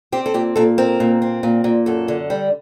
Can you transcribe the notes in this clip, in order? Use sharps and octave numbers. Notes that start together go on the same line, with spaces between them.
C4 G4
A4
A#2 G4
A#2 A4
C4 A#4
A#2
C4
A#2
A#2
F#2 A4
D3
G3